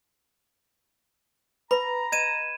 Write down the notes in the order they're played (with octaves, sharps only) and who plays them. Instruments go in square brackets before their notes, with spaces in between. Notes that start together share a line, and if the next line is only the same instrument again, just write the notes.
[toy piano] B4 [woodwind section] A#5 [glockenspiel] B5
[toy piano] D#5 [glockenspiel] G#6 D#7 E7